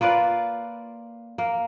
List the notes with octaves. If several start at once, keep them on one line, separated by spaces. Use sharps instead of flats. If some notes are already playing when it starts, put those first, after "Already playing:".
A#3 F4 B4 D5
A#3